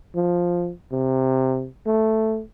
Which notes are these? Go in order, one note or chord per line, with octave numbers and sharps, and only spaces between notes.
F3
C3
A3